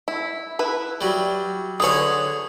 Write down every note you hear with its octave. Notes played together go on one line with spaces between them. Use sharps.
E4
E4 B4
F#3 G3
D3 G#4 B4 C#5 G#5 D#6